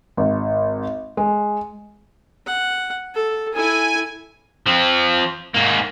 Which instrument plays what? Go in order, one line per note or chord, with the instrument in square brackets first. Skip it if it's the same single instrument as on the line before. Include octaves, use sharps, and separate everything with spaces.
[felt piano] G#1
G#3
[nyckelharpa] F#5
A4
[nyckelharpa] E4 A4 [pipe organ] G#5
[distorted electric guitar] F3 C4
G#2 A#3